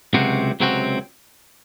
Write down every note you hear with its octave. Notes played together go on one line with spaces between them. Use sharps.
C#2 C3 F#3 C4 F#4
C#2 C3 F#3 C4 F#4